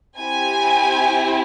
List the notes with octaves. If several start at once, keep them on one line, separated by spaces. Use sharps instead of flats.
C4 E4 G4 G#5